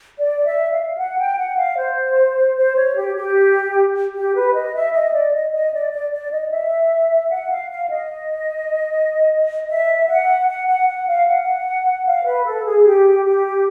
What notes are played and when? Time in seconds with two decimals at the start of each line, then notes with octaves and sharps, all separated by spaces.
0.20 D5
0.45 E5
0.71 F5
0.98 F#5
1.18 G5
1.37 F#5
1.57 F5
1.77 C5
2.57 C5
2.76 C#5
2.96 G4
3.16 G4
4.15 G4
4.35 B4
4.54 D#5
4.74 E5
4.93 D#5
5.13 D5
5.33 D#5
5.53 D#5
5.73 D5
5.92 D5
6.12 D5
6.31 D#5
6.51 E5
7.31 F#5
7.50 F5
7.71 F5
7.90 D#5
9.69 E5
10.08 F#5
10.47 F#5
10.66 F#5
10.87 F#5
11.07 F5
11.26 F#5
12.06 F5
12.25 B4
12.45 A4
12.64 G#4
12.84 G4
13.24 G4